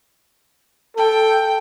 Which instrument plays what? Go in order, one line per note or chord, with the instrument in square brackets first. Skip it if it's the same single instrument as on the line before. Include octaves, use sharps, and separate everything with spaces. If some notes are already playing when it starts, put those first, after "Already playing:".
[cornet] A4 [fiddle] G5